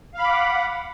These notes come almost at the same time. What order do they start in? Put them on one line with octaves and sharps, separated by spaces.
F5 B5 D6 F#5